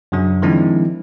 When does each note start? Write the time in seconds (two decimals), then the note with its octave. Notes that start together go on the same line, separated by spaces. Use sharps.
0.12 F#2 C#3 F#3 D4
0.42 D#3 F3 G#3 C4 D4 E4